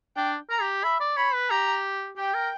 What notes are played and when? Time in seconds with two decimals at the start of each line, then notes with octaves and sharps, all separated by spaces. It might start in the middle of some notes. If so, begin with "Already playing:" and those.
0.16 D4 G5
0.50 A#4 A#5
0.61 G4
0.83 E5 B5
1.00 D5
1.17 C#5 B5
1.34 B4
1.50 G4 A#5
2.17 G4 G5
2.34 A#4